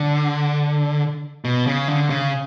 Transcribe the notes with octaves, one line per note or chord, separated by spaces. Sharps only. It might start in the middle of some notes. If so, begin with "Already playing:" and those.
Already playing: D3
B2
C#3
D3
C#3